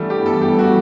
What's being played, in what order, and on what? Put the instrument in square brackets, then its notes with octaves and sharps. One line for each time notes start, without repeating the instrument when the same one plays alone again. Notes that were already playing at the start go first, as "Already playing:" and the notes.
Already playing: [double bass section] G2 E3 B3 [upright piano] G3 A3
[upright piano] G4
A4
G4
F#4